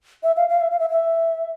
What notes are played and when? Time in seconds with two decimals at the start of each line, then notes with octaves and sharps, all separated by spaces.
0.23 E5
0.37 F5
0.49 F5
0.61 E5
0.71 F5
0.80 E5
0.90 E5